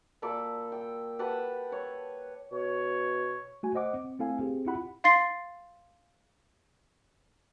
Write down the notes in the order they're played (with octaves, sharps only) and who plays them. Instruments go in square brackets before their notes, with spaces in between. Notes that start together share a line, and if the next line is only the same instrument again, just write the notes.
[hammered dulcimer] A#2 A4 B5 D6
G5
G4 B4 F#5 A5
C#5
[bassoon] B2 [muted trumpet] C#5
[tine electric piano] A3 F#4 G#5
C5 D#5 F#5 D6
C4
A3 C4 E4 A4 F5 G#5
C4 G4 G#4
E4 F4 G4 F#5 B5
[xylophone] F5 C6 A6 C7